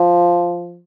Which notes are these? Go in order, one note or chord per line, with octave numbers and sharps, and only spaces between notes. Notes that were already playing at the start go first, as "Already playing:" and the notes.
Already playing: F3